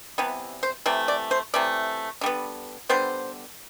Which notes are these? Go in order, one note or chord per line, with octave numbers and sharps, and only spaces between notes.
C3 E3 G3 B3 B4
C5
C3 E3 A3 D5
D5
C5
C3 E3 A3 D5
D3 G3 B3
D3 G3 B3 C5